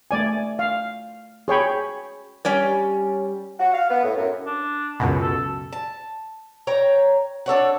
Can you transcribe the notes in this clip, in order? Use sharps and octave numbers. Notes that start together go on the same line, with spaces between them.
A3 D5 G#5
F5
G#4 C#5 G5 B5
G3 C#4 C#5 D5
F#4
F5
B3
A2
F#2
D4
C#2 F#2 B2
A4
A5
C#5 G5 A#5
D4 A4 C#5 F#5